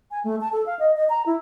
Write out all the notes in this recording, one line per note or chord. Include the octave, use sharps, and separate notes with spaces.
G#5
A3
A5
A4
F5
D#5
D#5
A#5
E4